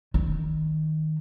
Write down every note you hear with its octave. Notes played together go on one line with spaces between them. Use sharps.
D#3